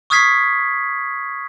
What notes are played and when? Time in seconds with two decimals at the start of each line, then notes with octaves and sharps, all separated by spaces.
0.10 C#6 D#6 F6 G#6 B6 C7